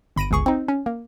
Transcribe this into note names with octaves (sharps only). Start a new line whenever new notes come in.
G1 B5 A#6 D7 D#7
G1 C#2 G#4 C#6
C4 D#4
C#4
A#3